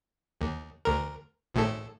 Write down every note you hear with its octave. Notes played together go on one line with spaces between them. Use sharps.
D#2
D2 A#4
G#1 A2 A4